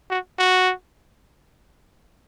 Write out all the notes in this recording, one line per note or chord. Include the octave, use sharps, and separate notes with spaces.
F#4
F#4